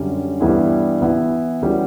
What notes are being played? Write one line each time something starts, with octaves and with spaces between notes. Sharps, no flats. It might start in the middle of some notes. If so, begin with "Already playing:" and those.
Already playing: F#2 D3 G3 C#4
G2 E3 G3 B3 E4
E3 B3 E4
E3 G3 C#4 F#4